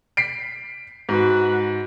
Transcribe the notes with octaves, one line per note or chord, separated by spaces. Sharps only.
B6 C7 D7
G#2 F#4 B4